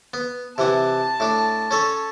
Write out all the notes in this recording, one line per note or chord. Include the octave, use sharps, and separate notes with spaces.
B3
C3 E3 F#5 A5
A2 D4
C#4 A4 C#5